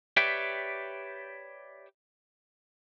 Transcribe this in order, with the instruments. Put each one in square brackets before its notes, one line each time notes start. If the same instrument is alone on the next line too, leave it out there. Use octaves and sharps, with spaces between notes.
[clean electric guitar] G4 B4 C#5 D5 E5 G5